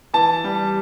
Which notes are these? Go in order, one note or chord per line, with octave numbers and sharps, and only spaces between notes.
E3 A5
G3